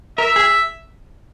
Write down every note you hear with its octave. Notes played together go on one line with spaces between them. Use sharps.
A#4 E5
G#4